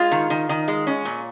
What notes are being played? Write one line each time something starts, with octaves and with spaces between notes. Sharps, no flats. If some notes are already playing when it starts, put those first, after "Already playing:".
Already playing: G#3 F4
D#3
D#3
D#3
G#3
C#4
A#2